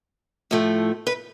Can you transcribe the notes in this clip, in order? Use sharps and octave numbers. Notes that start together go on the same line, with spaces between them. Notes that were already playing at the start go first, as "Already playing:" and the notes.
A2 F3 A3
B4